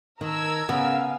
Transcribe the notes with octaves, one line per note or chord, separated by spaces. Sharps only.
D#3 A#4 A5 A#5 E6 G#6
C#3 B3 F5 G#5